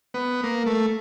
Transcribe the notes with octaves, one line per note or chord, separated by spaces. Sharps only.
B3
A#3
A3